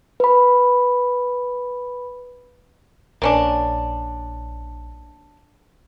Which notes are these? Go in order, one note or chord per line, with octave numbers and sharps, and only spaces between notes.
B4 B5
A#1 A#3 C#4 D4